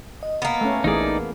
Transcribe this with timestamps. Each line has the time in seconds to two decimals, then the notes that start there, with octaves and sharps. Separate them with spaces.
0.23 D#5
0.42 A#3 B3
0.61 A3 C#4
0.84 A#1 E3 A3 D#4 G#4 D5